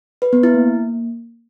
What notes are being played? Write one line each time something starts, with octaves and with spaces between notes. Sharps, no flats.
B4
B3
E4
A#3